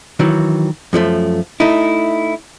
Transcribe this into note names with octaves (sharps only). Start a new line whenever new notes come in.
D#3 E3 F#3
F#2 F3 G#3 A3
A3 D#4 E4